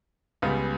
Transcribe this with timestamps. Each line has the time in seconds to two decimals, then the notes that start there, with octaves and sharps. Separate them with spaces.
0.42 C#2 C#3 G3 B3